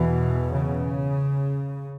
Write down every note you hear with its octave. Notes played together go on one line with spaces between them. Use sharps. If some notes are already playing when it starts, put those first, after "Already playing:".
Already playing: E2 B2 E3
C#3